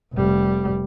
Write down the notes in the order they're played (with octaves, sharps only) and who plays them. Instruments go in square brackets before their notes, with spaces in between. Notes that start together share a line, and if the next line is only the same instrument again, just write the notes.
[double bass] F1 G3